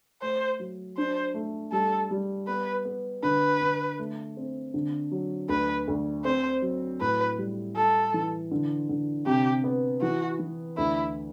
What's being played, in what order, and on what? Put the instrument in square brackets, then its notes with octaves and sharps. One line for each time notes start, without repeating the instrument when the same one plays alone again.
[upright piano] A3 [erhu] C5
[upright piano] F#3
[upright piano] D4 [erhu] C5
[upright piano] A3
[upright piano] G3 [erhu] A4
[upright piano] G3
[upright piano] B3 [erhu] B4
[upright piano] B3
[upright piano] D3 [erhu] B4
[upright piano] D3
A3
C4
D3
F#3
[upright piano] D2 [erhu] B4
[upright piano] D2
[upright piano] C4 [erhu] C5
[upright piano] F#3
[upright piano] A2 [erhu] B4
[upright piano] G3
[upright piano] G3 [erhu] A4
[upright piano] E3
D3
D3
[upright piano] C3 [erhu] G4
[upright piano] B3
[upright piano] E3 [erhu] F#4
[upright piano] E3
[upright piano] D2 [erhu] E4